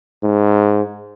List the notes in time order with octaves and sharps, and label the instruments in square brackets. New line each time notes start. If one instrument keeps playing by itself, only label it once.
[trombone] G#2